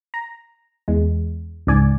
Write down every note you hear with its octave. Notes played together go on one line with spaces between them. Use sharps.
A#5
E2 G#3
C#2 G#2 D5 G#5